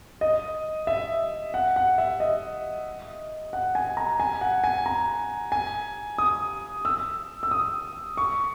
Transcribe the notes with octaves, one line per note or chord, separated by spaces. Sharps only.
D#5
E5
F#5
F#5
E5
D#5
F#5
G#5
A#5
G#5
F#5
G#5
A#5
G#5
D#6
E6
E6
D#6
C#6